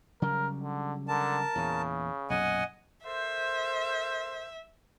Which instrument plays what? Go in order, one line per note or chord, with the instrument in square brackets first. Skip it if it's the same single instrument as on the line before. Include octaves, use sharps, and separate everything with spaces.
[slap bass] C#3 F#3 G3 [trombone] A#4
[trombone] D3
[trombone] D3 [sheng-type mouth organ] A#4 A5
[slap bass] E2 A#2 E3 [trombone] C#3
[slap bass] B1 F#2 A#2 [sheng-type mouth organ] D#5 F#5 G#5
[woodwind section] A4 A#4 C5 [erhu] E5